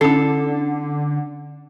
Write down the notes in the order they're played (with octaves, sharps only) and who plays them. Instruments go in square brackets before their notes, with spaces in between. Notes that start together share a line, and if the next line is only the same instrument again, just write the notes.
[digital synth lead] D3 [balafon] C#4 E4 [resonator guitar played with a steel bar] A4